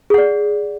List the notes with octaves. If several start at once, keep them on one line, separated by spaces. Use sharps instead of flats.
G#4 D5 F#5